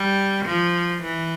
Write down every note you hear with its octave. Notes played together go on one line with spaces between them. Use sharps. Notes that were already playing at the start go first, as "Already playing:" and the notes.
Already playing: G3
F3
E3